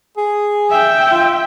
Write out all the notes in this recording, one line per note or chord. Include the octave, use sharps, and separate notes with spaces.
G#4
E5 G5
F4